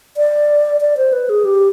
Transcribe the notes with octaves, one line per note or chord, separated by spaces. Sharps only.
D5
D5
C5
B4
G#4
G4